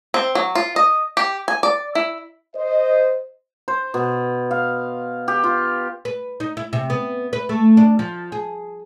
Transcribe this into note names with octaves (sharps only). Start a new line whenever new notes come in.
C4
F#3
F4
D#5
G4
G#5
D5
E4
C5 D#5
C5
B2
F5
G4
F4
B4
D#4
E4
C3
B3
B4
A3
D4
F3
G#4